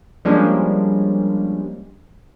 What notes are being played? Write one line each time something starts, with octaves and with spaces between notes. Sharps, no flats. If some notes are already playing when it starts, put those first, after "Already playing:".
F3 G3 G#3 A#3 C#4 D4